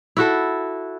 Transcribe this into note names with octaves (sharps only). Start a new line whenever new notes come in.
E4 F#4 A4